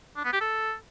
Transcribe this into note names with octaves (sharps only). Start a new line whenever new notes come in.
D4
B3
G4
A4